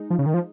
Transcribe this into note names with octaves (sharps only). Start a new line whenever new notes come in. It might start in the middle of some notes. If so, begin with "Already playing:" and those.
Already playing: G#3 D#4
F3
C#3
D#3
F3